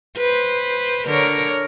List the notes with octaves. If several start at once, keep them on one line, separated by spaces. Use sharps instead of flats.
B4 C5
D3 A#4 C#5